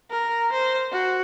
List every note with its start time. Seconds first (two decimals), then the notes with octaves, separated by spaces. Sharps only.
0.10 A#4
0.52 C5
0.92 F#4